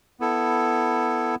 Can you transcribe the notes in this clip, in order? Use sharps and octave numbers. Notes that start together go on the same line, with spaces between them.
B3 E4 A4